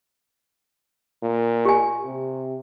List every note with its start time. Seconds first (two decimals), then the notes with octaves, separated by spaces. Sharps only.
1.23 A#2
1.65 G4 G#5
2.05 C3